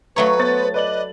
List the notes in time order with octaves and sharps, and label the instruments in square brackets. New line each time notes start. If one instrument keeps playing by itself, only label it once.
[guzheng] F#3 A3 C#5 [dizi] B4 [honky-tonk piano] A#5
[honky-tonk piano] B3 C5 A6
[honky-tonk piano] B4 D5 F#7 [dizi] D#5